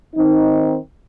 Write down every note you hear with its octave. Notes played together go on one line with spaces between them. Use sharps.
D#3 C4 D#4